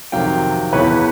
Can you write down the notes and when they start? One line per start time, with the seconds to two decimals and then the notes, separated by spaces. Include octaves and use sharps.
0.12 F2 C3 D#3 F#3 F5 G5
0.73 E2 C#3 E3 B4 C#5